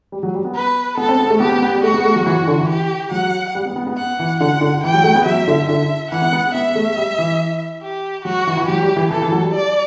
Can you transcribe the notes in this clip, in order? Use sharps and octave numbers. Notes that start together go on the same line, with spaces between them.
G3
F#3
G3
B3
B4
B3 A4
C4
B3
A3
B3 G4
B3
B3
G3
A3 F#4
B3
A3
F#3
E3 F#4
E3
D3
E3
G4
F#3 F#5
G3
B3
B3
B3
F#5
E3
D3 F#5
D3
E3 G5
F#3
A3
B3
F#3 E5
D3
D3 E5
E3 F#5
B3
B3
B3 E5
A3
G3
E3
G4
F#3 F#4
E3
E3
F#3 G4
G3
E3
E3 A4
E3
F#3
G3
D5